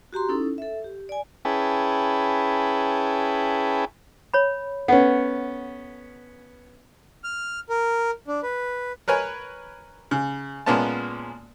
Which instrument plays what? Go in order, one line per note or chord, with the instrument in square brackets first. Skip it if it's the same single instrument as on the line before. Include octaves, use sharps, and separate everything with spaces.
[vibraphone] F#4 G4 A#5 C6
C#4 D#4 E4 A4
A4 E5
G4
D5 G#5
[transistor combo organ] C#4 E4 G#4 B4 G5 A5
[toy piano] C#5 B5
[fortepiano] B3 C#4 [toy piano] A4 F#5
[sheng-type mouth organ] F6
A#4
D4
B4
[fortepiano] A#4 B4 C#5 G#5
C#3
A#2 G#3 A#3 B3 C#4 A5